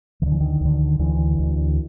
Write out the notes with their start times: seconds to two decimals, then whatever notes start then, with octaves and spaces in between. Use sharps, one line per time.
0.22 D2 D3 D#3
0.32 E3
0.41 D#3
0.61 D2 D3
0.99 D2 D3 E3
1.39 D2 D3